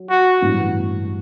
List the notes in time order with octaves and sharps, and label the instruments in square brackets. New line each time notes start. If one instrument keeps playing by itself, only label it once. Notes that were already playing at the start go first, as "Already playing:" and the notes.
Already playing: [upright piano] F#3
[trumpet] F#4
[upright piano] A1 G2 F#3 B3 E4